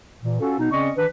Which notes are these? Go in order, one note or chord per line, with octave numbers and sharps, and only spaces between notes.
A#2 E3
C#4 F4 F#4 A4
B2 B3 D#4
C#3 C4 C#4 D5 D#5 C#6
D#3 E3 D4 B4